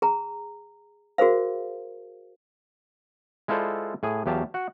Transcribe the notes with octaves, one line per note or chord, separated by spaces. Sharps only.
G#4 A#5
F#4 G#4 A#4 C5 F5
G#3 E4 F4 A4 C5 D5
A2 G#4 G#5
E2 F#3 G4 F5 A5
F#4 F#5